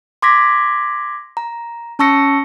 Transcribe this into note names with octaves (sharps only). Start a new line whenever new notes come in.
C6 D6 G#6 A#6 B6
A#5
C#4 A5 C#6 E6 A#6 C#7